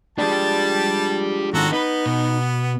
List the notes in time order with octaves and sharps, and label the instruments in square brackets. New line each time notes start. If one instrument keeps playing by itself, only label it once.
[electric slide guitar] F3 G#3 D4 [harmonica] G3 A5 [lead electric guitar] G4 D5
[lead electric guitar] D#3 C4 [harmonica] F#4 A4 A#5
[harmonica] B3 [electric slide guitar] D#4 [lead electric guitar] B4
[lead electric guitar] B2